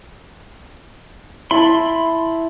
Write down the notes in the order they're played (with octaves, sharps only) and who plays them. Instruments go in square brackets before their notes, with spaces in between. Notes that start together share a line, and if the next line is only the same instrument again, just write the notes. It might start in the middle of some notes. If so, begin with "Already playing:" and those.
[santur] E4 A5 [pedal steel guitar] B5 C6